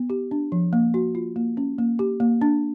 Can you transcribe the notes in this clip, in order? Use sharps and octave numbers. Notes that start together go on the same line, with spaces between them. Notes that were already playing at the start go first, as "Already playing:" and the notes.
Already playing: B3
G4
D4
F3
A#3
F#4
F4
A#3
C#4
A#3
G4
A#3
D4